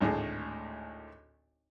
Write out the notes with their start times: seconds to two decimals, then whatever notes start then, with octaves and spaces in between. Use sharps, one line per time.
0.01 G#1 D2 A2 G#4